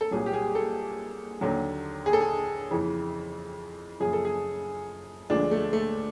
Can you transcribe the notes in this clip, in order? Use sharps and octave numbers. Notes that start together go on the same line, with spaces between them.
A4
C2 A#2 F#3 G#4
G4
G#4
A4
D#2 D3 F#3
G#4
A4
G#4
F2 C#3 E3
F#2 C#3 F3 G#4
A4
G#4
D2 D3 F3 G#3 D4
A3
A3